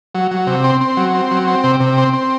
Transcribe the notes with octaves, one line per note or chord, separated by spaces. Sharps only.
F#3
F#3
C3
C4
C4
F#3
C4
F#3
C4
C3
C3
C4
C4